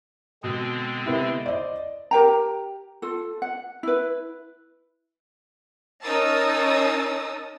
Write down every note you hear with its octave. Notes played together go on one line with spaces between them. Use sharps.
B2 D3 G#3 C4 D#6
C3 B3 E4
C5 D5 D#5
G4 A#4 G5 A#5
F4 A4
F#5
E4 B4
C#4 D#4 A#4 A5 D#6 E6